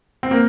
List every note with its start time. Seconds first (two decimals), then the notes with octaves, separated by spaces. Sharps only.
0.23 C4
0.31 A#3